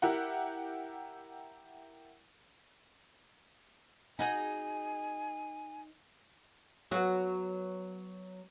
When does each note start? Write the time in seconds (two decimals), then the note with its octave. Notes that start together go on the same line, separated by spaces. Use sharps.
0.02 E4 G4 A#4 F#5
4.19 D#4 F#4 G#4 G#5
6.91 F#3 B3 F#4